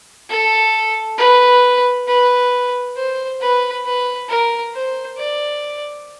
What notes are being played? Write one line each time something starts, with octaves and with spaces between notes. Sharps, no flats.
A4
B4
B4
C5
B4
B4
A#4
C5
D5